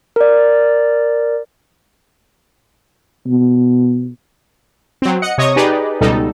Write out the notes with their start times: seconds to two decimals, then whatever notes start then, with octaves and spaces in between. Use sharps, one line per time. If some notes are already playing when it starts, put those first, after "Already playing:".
0.16 A#4 D5
3.27 B2
5.02 F#3 C4
5.22 D#5 F#5 C#7
5.38 C3 C#5 D#5 C#6 D#6
5.56 D#4 G4 G#4 B4 D5 D#5
6.01 C#2 B2 G3 D#4 A4